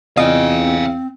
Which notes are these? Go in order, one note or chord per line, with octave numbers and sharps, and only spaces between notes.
E2 C4 F4 D#5 F5 G#5